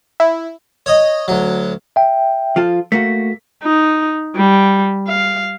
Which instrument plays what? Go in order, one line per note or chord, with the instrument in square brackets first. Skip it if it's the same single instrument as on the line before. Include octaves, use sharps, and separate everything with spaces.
[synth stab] E4
[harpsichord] C#5 D#5
D2 F#3
[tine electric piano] E5 G5
[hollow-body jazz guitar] F3 F4 A4
[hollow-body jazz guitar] A3 A#3 F#4 [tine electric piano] B6
[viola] D#4
G3
F5